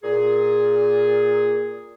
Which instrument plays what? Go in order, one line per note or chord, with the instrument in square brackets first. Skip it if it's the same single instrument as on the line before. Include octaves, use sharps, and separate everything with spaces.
[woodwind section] A#2 G#4